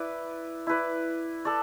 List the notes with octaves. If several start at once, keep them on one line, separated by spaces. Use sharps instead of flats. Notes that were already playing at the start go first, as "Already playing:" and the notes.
Already playing: E4 B4 D5
E4 B4 D5
A4 D5